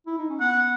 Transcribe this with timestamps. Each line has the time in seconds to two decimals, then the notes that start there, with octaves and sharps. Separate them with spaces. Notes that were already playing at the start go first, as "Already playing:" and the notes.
0.07 E4
0.18 D#4
0.29 C#4
0.40 B3 F#5